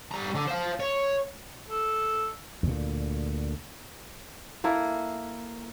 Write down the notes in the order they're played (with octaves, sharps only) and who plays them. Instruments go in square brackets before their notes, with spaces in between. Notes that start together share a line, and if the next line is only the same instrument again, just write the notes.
[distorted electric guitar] G3 A#5
D3
C5 F5
C#5
[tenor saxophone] A4
[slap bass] D2 A#2
[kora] A#3 E4 A4